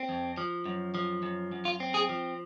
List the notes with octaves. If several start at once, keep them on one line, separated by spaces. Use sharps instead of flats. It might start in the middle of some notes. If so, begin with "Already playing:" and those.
Already playing: C4
F2
F3
F#2
F3
F#2
F#2
F4
C4
G#4
F3